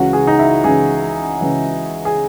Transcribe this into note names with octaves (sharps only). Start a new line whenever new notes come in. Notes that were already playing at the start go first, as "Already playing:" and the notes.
Already playing: C#2 C#3 E3 F#4
G#4
D#4
E4
C#2 C#3 E3 G#4
C#2 C#3 E3
G#4